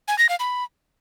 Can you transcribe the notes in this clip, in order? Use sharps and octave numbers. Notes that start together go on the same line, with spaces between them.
G#5
A#6
F5
B5